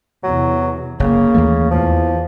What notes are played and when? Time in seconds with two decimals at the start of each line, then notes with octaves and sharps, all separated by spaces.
0.24 E2 C3 F#3
1.00 F#1 C#3 A#3
1.35 D#2 E3 A3
1.71 E2 F3